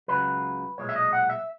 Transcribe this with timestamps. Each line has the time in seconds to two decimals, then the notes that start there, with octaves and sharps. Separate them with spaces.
0.08 C#2 C#3 F#3 B4
0.78 B1 A#2 G#3 C#5
0.89 E5
0.96 D#5
1.13 F#5
1.30 E5